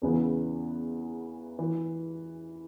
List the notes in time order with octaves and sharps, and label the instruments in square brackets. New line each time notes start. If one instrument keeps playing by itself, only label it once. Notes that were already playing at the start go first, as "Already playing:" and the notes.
[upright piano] E2 C#3 E3 B3
E3